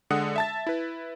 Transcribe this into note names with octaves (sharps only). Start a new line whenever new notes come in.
D3 G#3 F#5 D#6
E5 A5 A6
E4 B4